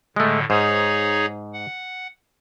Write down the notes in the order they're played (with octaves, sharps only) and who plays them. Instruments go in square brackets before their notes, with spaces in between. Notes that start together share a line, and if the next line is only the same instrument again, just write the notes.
[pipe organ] A2 D3 [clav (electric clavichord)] G#3 A3
[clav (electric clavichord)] G#2 C5 [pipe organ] D#4 G#4 C#5
[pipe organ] F#5